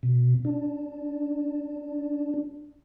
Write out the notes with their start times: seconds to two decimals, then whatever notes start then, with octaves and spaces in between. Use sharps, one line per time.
0.03 B2
0.45 D4